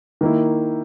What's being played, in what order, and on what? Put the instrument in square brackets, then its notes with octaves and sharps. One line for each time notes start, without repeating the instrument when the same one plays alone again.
[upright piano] D#3 A#3 E4